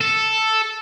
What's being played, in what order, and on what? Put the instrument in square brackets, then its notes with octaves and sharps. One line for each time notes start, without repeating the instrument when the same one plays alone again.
[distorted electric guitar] A4